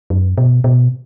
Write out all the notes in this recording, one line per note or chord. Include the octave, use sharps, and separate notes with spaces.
F#2
B2
B2